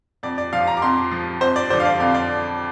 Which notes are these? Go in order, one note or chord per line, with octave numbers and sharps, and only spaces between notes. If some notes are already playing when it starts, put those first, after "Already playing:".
F2 D5
D5
F3 F5
A#5
D6
F2 C6
F3
F2 C5
D5
D3 F3 C5
F5
D5
F2 F5
D5